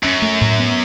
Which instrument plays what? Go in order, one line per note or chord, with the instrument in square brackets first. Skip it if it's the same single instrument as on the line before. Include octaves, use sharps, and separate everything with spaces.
[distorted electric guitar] F#2 [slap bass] C#4
[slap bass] A3
A2
B3